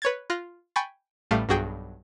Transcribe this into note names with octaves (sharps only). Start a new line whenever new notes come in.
B4 C#5 G#6 A6
F4 F#6 A#6
G5 G#5 B5 C#6 A6
A1 A2 G3 A3 F5
B1 G2 F#4 G#4 G5